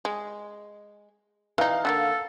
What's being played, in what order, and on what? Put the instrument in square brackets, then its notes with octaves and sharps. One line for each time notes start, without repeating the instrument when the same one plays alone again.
[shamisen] G#3
[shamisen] E3 D#4 [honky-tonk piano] F5
[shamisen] D3 G#3 A#3 [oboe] A4